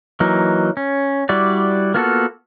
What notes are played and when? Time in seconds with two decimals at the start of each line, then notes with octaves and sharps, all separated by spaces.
0.20 E3 F#3 A#3 D#4
0.77 C#4
1.29 G3 E4 F#4 D5
1.94 A#3 B3 F4 F#4 A4